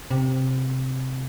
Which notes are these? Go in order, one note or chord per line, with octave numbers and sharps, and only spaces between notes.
C3